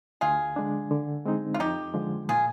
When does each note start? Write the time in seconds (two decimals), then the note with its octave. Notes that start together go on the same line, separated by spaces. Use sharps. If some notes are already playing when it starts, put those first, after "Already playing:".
0.21 D2 F4 G#4
0.56 D3 G#3 D4
0.91 D3
1.25 G#3 C4 D#4
1.54 F4
1.59 F2 D#4 G4
1.94 D3 F3 G#3
2.29 A#2 F4 G#4